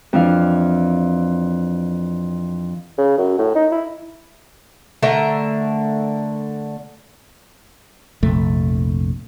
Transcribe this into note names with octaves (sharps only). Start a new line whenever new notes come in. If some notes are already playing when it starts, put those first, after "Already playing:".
F2 E3 D4 F5
C#3
F#2
A2
D#4
E4
D3 A3 A#4 E5
A#1 F2 C3 A3